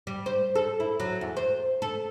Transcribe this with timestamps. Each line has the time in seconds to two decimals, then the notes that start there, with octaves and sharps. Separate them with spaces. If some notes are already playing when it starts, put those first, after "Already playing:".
0.07 G3
0.26 C5
0.55 A4
0.80 E4
1.00 F#3
1.21 E2
1.37 C5
1.82 A4